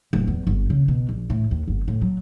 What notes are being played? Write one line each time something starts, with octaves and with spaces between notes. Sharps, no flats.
D1
E2
G1
C#3
B2
A#1
A2
D#2
G1
A2
F#3